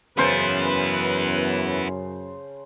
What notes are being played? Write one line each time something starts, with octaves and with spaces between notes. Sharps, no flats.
F#2 C#3 B3 E4 B4 C5 A5